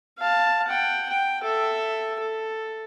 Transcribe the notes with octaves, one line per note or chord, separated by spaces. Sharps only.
F5 A5
F#5 G5
G5
A4 E5
A4